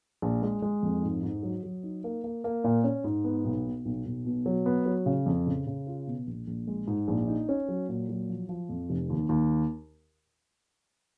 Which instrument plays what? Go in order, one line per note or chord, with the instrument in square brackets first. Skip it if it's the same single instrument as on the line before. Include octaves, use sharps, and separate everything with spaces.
[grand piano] A#1
G#3
G#3
F2
G#2
G#2
F#3
F#3
D#4
A#3
A#3
A#3
A#2
C#4
G#2
B3
B1
B2
B1
B1
B2
F#3
B3
F#3
C#3
F2
C#3
C#3
F4
B2
A#1
A#1
G#3
G#2
A#1
D#4
C#4
F#3
A#2
F#3
F3
F3
F2
F1
D#2
D#2